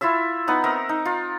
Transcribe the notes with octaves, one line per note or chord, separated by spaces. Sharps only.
E4 F4 E5 E6
B3 D#4 F#5 D#6
C4 A#4 E5 A#5
D#4
F4